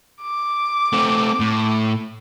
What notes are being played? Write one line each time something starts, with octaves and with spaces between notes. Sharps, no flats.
D6
A3 C4
A2